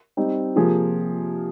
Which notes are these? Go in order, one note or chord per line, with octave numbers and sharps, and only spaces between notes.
G3 C4 D#4
C3 F3 A#3 F4 G#4